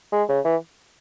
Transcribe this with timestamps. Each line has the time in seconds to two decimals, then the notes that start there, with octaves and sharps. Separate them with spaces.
0.12 G#3
0.29 C#3
0.45 E3